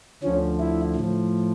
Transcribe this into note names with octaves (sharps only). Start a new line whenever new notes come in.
D2 D3 F3 C#4
E4
A2 F3